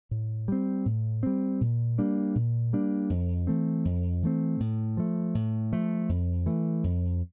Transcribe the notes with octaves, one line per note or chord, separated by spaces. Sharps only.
A2
G3 C4
A2
G3 C4
A#2
G3 A#3 D4
A#2
G3 A#3 D4
F2
E3 A3 C4
F2
E3 A3 C4
A2
F3 A3
A2
F3 A3
F2
E3 A3
F2